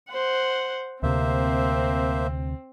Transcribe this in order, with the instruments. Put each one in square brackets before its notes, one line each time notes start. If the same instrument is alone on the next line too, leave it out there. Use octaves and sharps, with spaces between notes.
[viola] C5 F#5
[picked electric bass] D2 C3 [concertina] A#3 C5 E5 [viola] C4